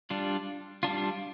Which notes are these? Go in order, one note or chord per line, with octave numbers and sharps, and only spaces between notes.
G3 D4 F4
G3 D4 F4